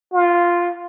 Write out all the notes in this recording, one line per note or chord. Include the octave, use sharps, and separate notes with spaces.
F4